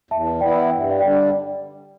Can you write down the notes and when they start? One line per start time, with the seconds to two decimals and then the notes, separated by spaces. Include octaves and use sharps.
0.11 E2 E5 A5
0.41 E3 B3 E4 D5 G5
0.71 G2 G5
0.81 E5
0.90 D5 G5
1.00 D3 G3 D5 G5